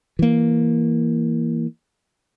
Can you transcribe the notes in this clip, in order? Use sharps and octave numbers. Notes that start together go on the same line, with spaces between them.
E3 A#3